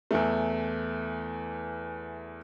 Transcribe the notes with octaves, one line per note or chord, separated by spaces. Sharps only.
E2 E3 A3